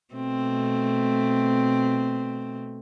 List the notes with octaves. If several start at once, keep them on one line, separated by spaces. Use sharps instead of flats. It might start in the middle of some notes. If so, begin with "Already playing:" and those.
B2 A3 C4